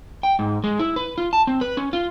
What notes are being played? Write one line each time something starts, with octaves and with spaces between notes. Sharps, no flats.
G5
G#2
G#3
E4
B4
F4
A5
C4
B4
C#4
F4